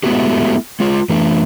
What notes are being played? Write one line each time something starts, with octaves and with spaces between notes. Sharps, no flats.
G#3 A3 B3 E4 F#4 G4
G#3 F4
E3 A3 D4